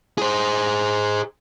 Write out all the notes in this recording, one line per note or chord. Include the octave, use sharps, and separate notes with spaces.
G#4 C5